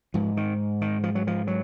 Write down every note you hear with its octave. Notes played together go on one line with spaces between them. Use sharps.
G#2 F3
D#3
D#3
F3
F#3
F3
F#3